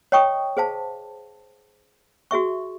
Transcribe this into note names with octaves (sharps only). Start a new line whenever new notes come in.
C#5 D#5 G5 C#6 D#6
G#4 C5 F5 A5
F#4 G#4 E5 C#6